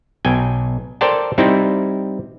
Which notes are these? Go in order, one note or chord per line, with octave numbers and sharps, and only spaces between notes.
B1 G5 G#5
A4 A#4 C5 D5 G5 A5
G3 C4 D#4 E4